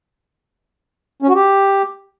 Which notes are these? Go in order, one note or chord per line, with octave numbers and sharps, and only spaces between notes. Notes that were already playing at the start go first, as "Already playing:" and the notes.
C#4
F#4
G4